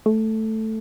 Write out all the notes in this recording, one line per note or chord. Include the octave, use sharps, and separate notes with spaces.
A3